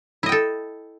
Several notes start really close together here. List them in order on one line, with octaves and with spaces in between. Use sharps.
E4 D#5 G5 A4